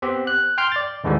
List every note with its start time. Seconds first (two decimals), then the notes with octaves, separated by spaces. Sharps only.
0.02 B3 C4 G4
0.27 F#6
0.58 G5 C6 F6 G6
0.72 D5 A6
1.04 D#2 G#2 D3 E3 G3